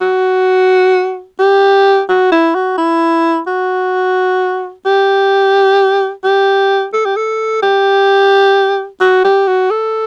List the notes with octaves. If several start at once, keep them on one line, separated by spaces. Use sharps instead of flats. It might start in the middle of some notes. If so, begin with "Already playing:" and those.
F#4
G4
F#4
E4
F#4
E4
F#4
G4
G4
A4
G4
A4
G4
F#4
G4
F#4
A4